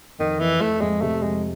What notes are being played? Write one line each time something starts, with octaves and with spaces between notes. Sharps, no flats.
F2 D#3
F2 E3
F2 A3
F2 G#3
C3 A3
F2 G#3